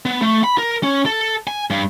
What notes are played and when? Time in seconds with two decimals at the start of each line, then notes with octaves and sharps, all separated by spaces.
0.06 B3
0.22 A3
0.44 B5
0.58 A#4
0.83 C#4
1.06 A4
1.47 G#5
1.70 G2